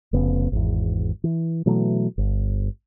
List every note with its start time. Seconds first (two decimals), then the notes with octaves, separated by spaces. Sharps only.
0.13 F1 C#3 B3
0.52 G#1 E2
1.24 E3
1.66 B2 E3 F#3 A3
2.18 G1